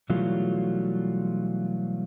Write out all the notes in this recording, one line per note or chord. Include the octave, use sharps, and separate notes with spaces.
B2 E3 F#3 G3 A3 F4